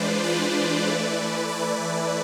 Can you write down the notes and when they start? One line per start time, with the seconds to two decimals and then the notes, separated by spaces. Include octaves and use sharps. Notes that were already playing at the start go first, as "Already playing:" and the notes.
Already playing: E3 G#3 D4 F4 B4 C5 D5
0.24 B4 D5
0.86 E3 A3 E4
1.49 B4 D5